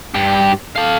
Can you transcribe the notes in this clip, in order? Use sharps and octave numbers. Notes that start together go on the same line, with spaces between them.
G2 G4
A4 F5